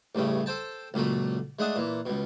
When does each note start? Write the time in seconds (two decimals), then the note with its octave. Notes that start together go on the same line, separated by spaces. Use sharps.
0.15 A1 G2 C#3 A3
0.46 A4 C5 G5 A5
0.94 C#2 A#2 F#3 A3
1.59 G#3 A3 D4 F#5 A5 D#6
1.76 A#2 E3
2.06 C#2 B2